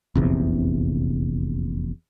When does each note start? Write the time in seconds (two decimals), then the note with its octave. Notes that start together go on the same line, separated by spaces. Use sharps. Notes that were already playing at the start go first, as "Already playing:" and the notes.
0.15 F1 A#1 E2 C3